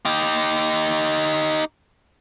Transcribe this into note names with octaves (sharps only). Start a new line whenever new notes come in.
D#4 G4